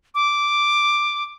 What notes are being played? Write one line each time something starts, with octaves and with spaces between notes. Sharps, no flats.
D6